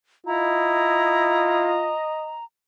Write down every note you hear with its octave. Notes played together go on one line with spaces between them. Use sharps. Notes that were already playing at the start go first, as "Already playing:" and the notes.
E4 F4 D#5 A#5